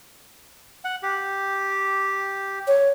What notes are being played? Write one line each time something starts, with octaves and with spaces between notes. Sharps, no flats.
F#5
G4
C#5